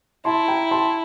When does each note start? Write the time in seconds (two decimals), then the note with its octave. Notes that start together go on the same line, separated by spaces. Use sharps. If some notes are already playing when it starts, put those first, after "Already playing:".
0.25 E4 A5 C6
0.48 G5 A#5
0.71 A5 C6